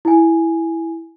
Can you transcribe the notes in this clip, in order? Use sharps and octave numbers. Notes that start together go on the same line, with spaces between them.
E4 G#5